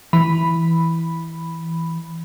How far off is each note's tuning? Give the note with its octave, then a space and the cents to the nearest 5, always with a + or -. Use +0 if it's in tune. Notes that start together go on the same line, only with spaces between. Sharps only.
E3 +0 B5 +0